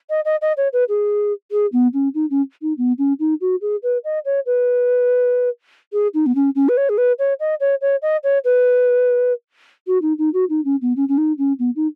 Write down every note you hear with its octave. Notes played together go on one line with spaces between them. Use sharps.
D#5
D#5
D#5
C#5
B4
G#4
G#4
B3
C#4
D#4
C#4
D#4
B3
C#4
D#4
F#4
G#4
B4
D#5
C#5
B4
G#4
D#4
B3
C#4
C#4
B4
C#5
G#4
B4
C#5
D#5
C#5
C#5
D#5
C#5
B4
F#4
D#4
D#4
F#4
D#4
C#4
B3
C#4
C#4
D#4
C#4
B3
D#4